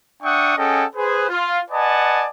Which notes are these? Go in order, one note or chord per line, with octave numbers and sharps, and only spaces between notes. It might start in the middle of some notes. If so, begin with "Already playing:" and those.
D4 E5 F#5 G5 C#6 D#6
C#4 G#4 A4 D#5 F#5 G5
G#4 B4 C5
F4
B4 D5 D#5 F#5 G#5 A5